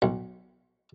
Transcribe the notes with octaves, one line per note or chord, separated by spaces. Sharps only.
B1